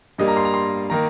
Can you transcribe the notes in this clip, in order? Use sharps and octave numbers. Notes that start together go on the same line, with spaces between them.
G2 G3 A#3 D#5
A#5
C6
A#5
C6
D#3 A#3 A#5